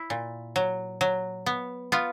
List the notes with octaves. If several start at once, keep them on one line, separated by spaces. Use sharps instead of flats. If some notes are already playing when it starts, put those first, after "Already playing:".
Already playing: E4
A#2
F#3
F#3
B3
B3 F4